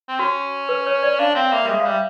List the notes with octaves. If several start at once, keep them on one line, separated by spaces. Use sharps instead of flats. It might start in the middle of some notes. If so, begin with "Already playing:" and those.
C4
C#4 F#4
B4
C#5
D5
D4 F5
C4 F5
A#3 E5
G3
G#3 E5
F5
G3
E5